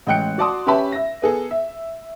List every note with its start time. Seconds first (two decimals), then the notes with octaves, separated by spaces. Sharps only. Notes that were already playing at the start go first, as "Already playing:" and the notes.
0.07 A1 G#3 G5 F#6 C#7
0.38 F#4 D5 A5 C6 D#6
0.67 C#4 G4 B4 E5 A5 B5
0.92 E5 A#6
1.22 B3 G#4 A4
1.51 E5